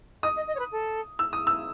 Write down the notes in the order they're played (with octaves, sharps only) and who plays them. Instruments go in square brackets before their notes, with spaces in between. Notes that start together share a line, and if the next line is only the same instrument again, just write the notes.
[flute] D#5 [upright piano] D#6
[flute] D#5
D#5
C#5
B4
A4
[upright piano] E6
D#6
E6